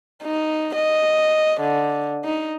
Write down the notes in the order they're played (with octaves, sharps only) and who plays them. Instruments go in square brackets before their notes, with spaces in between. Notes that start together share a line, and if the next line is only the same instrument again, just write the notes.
[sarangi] D#4
D#5
D3
D#4